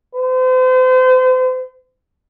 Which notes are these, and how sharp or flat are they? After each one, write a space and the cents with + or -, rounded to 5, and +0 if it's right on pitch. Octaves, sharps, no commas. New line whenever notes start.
C5 -40